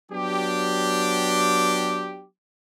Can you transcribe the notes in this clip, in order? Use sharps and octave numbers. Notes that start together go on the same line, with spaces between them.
F#3 B3 D4 G4